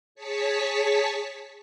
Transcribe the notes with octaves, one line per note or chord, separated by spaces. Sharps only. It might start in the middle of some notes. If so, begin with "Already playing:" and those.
G#4 C#5 A5 C#6 B6